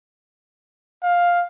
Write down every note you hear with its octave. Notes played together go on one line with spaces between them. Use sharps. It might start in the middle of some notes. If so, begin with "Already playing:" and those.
F5